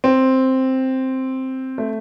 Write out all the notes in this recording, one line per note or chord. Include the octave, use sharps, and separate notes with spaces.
C4
A3